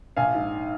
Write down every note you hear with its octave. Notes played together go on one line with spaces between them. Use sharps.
A#1 F5 G#5
G#2